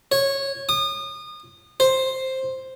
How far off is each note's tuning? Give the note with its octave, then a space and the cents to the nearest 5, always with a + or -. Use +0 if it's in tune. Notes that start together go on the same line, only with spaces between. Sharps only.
C#5 -15
D#6 -30
C5 +5